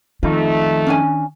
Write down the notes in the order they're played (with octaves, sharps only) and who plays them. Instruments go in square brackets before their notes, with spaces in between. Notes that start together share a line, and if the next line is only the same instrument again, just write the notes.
[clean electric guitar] F2 D#4 [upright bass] D#3 [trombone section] A3 [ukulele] F4
[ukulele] C#4 D4 G#5